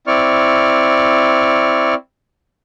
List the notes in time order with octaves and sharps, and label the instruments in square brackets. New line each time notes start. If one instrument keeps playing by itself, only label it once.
[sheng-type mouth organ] C4 E4 D5 C#6 F6